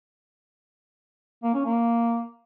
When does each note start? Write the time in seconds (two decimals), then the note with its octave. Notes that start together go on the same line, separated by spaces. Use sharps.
1.43 A#3
1.54 C#4
1.66 A#3